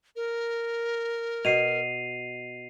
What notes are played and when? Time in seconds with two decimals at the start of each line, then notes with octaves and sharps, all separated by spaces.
0.16 A#4
1.45 B2 C7 D#7 F7